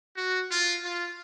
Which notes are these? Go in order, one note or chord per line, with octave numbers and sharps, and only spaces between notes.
F#4
F4
F4